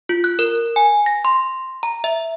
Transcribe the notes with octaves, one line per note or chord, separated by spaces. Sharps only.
F4
F#6
A#4
G#5
A#6
C6
A#5
E5